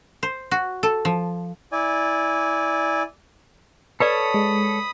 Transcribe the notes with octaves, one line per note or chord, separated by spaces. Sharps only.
C5
F#4
A4
F3
E4 D5 G#5
A4 B4 C#5 D5 A5 B5 D#6
G#3